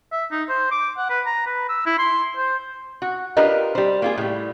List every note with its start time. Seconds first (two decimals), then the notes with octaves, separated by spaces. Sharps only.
0.12 E5
0.32 D#4
0.49 C5
0.71 D6
0.98 F#5
1.10 B4
1.26 A#5
1.46 B4
1.69 E6
1.86 E4
1.98 C6
2.37 C5
3.02 F#4
3.37 D4 F4 G4 A#4 B4 D#5
3.75 G3 C5
4.02 A#3 F4 G#4
4.18 A2 G3